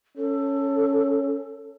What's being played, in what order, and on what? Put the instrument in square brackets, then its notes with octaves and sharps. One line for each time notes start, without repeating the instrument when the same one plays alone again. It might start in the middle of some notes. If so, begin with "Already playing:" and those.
[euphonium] C#4 [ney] A4